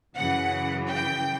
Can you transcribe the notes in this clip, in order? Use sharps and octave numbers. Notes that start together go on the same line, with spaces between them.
F#2 C#3 E3 F#5
G5